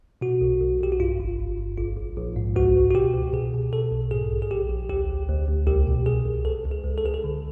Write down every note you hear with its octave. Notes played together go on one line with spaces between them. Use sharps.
B2 F#4
B1
B1
B1 G4
F#4
G2 F4
G1
G1
G1
A#1 F4
A#1
A#1
G#2
C#2 F#4
C#2
F#4
B2 G4
C#2
B2 G#4
B2
B2 A4
B1
G#2 G#4
A#1
G#4
A#1 G4
A#1
D2 G4
D2
D2
D2
C2 G4
B2
C2 G#4
C2
C#2 A4
C#2
G#4
C#2
A4
C#2 G#4
A4
D3